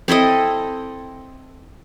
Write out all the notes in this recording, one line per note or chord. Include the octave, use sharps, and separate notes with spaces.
C4 E4 A4 D#5